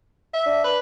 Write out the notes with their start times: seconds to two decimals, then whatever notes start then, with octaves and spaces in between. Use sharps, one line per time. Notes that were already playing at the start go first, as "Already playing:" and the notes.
0.34 E5
0.46 D4
0.64 B4